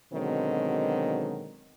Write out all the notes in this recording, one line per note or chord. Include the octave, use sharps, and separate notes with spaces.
B2 D3 D#3 F#3 G#3 C4